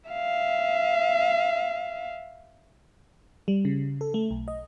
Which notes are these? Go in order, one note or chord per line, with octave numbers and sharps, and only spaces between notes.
E5 F5
G3
C#3
A4
A3
B1
D#5